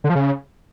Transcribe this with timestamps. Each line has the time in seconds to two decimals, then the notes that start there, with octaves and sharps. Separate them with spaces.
0.04 D3
0.10 F3
0.15 C#3